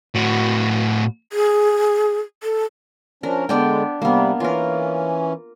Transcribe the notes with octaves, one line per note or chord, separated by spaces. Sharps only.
A2 F#4
G#4
A4
F3 C#4 D4 A#4
D3 G#3 B3 D4 G5
C3 G3 A#3 B3
E3 C#4 F4 A#4